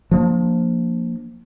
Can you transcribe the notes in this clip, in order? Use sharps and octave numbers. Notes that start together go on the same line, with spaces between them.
F3 A#3 D4